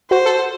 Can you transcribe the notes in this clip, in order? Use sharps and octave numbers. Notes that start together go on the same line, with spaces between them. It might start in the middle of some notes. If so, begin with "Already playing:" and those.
F#4 C5
A4